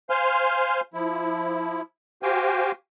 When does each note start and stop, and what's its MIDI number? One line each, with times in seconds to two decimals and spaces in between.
0.10 0.81 72
0.10 0.81 77
0.10 0.81 80
0.10 0.81 84
0.10 0.81 89
0.94 1.81 53
0.94 1.81 64
2.23 2.72 66
2.23 2.72 67
2.23 2.72 72
2.23 2.72 77
2.23 2.72 79
2.23 2.72 80